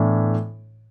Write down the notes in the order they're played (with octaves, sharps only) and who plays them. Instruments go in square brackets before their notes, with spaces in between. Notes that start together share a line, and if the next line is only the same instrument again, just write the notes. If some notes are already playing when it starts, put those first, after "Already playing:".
Already playing: [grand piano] A2 E3 B3 D4